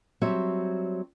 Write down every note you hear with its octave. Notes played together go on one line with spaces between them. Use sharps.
F#3 G3 C4 C#5 E5